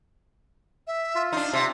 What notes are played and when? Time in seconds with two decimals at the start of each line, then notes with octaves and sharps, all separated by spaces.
0.87 E5
1.15 F4
1.33 D4 D#4 C6
1.53 C3